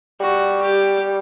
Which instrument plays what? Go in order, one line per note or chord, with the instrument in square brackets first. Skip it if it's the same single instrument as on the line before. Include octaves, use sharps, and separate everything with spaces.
[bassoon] G3 [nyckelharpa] F#4
[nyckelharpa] G4